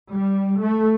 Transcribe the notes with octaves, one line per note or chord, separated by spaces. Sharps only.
G3
A3